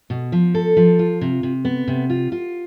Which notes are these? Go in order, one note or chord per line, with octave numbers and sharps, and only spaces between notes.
B2
F3
A4
F3
F4
C3
C3
B3
C3
F4
F4